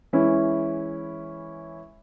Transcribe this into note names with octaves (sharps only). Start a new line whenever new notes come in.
E3 G#3 C#4 E4